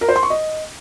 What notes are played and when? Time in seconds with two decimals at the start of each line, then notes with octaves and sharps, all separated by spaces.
0.01 A#4
0.09 C5
0.16 C6
0.23 C#6
0.30 D#5